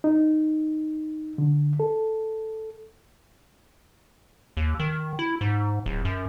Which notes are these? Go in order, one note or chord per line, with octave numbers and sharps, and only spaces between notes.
D#4
D3
A4
D#2
D#3
E4
G#2
D1
F#2